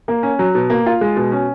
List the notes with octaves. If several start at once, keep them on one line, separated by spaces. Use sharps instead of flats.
A#3
C#4
F#3
B2
A#3
F4
G#3
B2
C#4